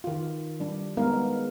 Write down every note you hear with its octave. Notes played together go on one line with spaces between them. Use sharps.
D#3 F4
G3 D4
G#3 B3 D#4 A#4 F5
G#3